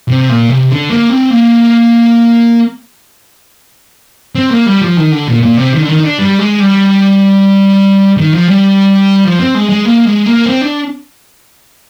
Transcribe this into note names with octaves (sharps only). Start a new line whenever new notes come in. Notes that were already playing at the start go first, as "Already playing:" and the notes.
C3
A#2
C3
D3
A#3
C4
A#3
C4
A#3
G3
F3
D#3
D3
A#2
A#2
C3
D#3
D3
D#3
D#4
D4
G3
G#3
G3
D#3
F3
G3
F3
C4
G#3
G#3
A#3
G#3
A#3
C4
D4